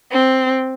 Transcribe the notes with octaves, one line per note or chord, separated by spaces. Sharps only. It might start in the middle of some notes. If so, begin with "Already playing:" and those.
C4